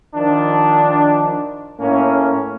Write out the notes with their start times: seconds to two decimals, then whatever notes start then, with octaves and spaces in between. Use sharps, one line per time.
0.15 D#3 F3 D4
1.79 A2 A#3 C#4